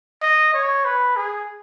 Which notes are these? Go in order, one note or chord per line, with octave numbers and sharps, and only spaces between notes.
D#5
C#5
B4
G#4